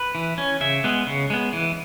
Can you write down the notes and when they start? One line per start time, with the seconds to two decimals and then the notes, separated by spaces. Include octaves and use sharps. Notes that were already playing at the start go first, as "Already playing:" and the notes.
Already playing: B4
0.15 E3
0.38 C#4
0.61 C#3 E5
0.84 G#3 B3
1.07 C#3
1.30 G#3 B3
1.53 E3